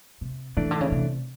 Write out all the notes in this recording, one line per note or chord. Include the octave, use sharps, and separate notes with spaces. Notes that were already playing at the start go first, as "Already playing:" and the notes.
C3
C#3 E3 A3 D4
D3
C#3
C3